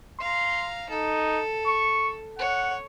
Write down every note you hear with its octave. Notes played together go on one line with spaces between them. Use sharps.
F5 A#5 C6
D#4 A4
C#6
C#5 F#5